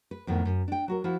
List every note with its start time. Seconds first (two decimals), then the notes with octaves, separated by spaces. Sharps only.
0.11 B4
0.27 F2 A2 D#3 B3
0.45 F#2
0.68 D4 G5
0.88 F#3 F#4 A#4
1.04 F3 E4 F#4